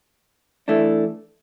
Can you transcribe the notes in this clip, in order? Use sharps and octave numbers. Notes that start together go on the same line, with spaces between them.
E3 A3 D4